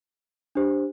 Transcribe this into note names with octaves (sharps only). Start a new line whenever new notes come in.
D4 G4 C5